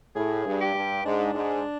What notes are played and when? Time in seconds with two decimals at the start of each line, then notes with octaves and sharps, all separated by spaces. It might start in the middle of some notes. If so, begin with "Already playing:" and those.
0.15 A2 G#4
0.46 G2
0.61 G4
0.75 G2
1.04 G#2 D4
1.34 G#2